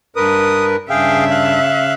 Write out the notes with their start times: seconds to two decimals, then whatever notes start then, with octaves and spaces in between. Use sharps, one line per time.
0.16 G2 A#4 B4 D#6
0.90 G2 C#3 G#4 E5 F5 G5
1.30 F5 F#6